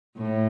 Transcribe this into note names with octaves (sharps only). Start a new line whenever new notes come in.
A2